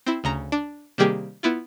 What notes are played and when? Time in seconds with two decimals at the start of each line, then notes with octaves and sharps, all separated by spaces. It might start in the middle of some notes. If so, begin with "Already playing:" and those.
0.06 C4 E4
0.24 D2 C#3 A#5
0.52 D4
0.98 C3 D#3 G3 A#3 G4 G#4
1.43 B3 E4 F4